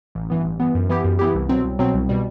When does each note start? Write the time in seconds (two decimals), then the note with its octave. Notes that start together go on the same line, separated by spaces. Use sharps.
0.15 A1
0.30 G2 E3 B3
0.45 A1
0.60 G2 E3 B3
0.75 F#2
0.89 E3 B3 E4 G4
1.04 F#2
1.19 E3 B3 E4 G4
1.35 C2
1.49 B2 F#3 C4
1.64 C2
1.79 B2 F#3 C4
1.94 C2
2.09 B2 G3